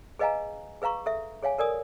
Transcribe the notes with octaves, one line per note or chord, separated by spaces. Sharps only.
G#4 B4 D#5 F5 G#5 A#5
G#4 B4 F5 A#5 C#6
A4 E5
G#4 C#5 F5 G#5
A4 A#4 D5 G#5 D#6